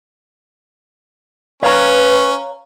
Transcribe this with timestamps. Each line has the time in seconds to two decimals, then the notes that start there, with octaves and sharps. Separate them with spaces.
1.63 C#4 B4 C#5 F5 A#5